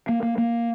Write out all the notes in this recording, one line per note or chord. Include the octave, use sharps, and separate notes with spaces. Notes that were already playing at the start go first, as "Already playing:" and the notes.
A#3
A#3
A#3